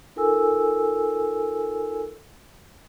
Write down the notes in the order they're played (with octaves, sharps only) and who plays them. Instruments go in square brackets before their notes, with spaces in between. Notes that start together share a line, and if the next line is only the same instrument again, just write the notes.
[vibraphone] D#4 F4 A4 A#4 G#5 E6